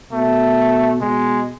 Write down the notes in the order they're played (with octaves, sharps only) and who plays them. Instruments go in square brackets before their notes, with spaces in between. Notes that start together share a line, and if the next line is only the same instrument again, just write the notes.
[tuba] B2 [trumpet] A3
[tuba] B2 [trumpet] G#3